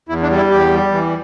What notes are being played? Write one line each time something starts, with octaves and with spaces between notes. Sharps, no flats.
E2 E4
D4
G3
E4
E2 G4
G3
E3